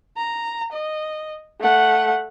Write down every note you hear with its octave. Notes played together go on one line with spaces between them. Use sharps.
A#5
D#5
A3 F#5